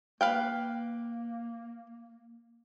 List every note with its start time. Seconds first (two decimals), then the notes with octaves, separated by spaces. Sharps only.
0.21 A#3 B4 F5 G5